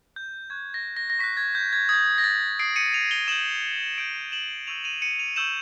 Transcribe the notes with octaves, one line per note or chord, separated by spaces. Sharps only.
G6
C#6 F#6 G#6
A#6
A#6
A#6
C#6 F#6 B6
G#6
G6
G#6
D#6 G6 G#6
A#6
A6
D#6 G6 C7 D7
C#7 D#7
D#7 F7
F7 G7
D#6 G6 E7 F#7
D#6 G6 D7 E7
E7 F#7
C#6 E6 G6 D#7 F7
D#7 F7
C#7 D#7
D#7 F7
C#6 E6 G6 E7 F#7